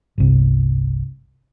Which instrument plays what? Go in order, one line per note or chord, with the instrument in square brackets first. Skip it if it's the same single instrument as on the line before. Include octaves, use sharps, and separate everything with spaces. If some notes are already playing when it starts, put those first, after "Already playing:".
[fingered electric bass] G1 C2